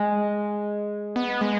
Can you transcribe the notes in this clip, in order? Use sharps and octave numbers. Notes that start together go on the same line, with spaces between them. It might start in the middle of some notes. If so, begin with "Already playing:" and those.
Already playing: G#3
B3
G#3